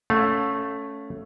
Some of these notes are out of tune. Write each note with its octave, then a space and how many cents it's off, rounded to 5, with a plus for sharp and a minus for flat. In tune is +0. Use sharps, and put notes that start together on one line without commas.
A3 +0 C#4 +5 F5 +35